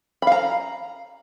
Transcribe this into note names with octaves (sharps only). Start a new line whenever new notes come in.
F5 A#5 B5